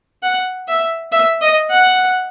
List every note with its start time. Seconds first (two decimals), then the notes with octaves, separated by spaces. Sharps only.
0.23 F#5
0.68 E5
1.12 E5
1.41 D#5
1.71 F#5